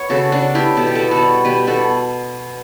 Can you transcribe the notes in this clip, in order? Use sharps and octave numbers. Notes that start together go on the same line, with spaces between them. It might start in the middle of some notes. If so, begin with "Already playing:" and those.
Already playing: B3 C#5
C#3 F#4 A4
C#3 D4 F#4
B3 E4 G4
B2 A4
G4
B3 F#4 A4
F#4 A4
G3
B2 G4 B4
B2 F#4 A4